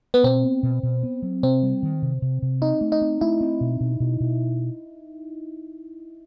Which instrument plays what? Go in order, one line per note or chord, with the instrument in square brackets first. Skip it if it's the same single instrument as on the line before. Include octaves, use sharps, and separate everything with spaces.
[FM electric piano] B3
[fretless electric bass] B2 [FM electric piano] C4
[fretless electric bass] B3
B2
B2
B3
F#3
[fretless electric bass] C3 [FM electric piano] C4
[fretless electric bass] G3
D#3
C3
C3
C3
[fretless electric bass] C4 [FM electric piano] D#4
[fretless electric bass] A3
[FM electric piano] D#4
[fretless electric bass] C4
[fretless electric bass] A3 [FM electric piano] E4
[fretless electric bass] C4
B2
B2
B2
B2